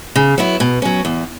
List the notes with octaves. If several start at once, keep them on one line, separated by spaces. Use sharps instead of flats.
C#3
F#3 B3 E4
B2
F#3 C#4
E2